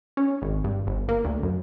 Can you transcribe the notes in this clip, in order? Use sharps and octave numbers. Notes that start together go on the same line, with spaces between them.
C#4
G#1
G2
G1
A#3
D2
F#2